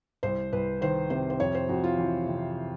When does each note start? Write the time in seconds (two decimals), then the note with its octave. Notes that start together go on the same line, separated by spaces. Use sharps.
0.23 C2 C5
0.52 C2 B4
0.81 D#3 C5
1.10 C3 C5
1.30 C5
1.39 F2 C#5
1.55 C5
1.69 F2 F#4
1.84 F4
1.98 E3
2.28 C3